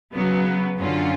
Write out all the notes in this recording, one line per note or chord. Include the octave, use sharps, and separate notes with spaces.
C#3 F#3 B3
F#2 D3 F#3 C#4 F4